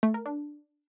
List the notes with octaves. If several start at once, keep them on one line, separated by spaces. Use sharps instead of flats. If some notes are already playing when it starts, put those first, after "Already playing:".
A3
A#4
D4